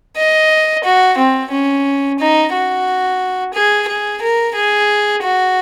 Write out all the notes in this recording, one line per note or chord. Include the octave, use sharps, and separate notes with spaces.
D#5
F#4
C4
C#4
D#4
F#4
G#4
G#4
A#4
G#4
F#4